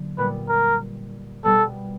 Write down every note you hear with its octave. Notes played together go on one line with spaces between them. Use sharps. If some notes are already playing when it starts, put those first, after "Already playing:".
Already playing: D3 F#3 A#3
A#2 G3 B3 B4
A#4
B2 G3 B3 A4